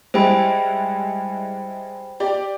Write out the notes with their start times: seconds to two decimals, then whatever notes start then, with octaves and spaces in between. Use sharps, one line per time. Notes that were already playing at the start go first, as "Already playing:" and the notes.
0.14 G3 G#3 E4 C5 G5 B5
2.20 G4 D5